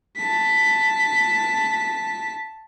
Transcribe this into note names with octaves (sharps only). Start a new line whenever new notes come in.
A5 B6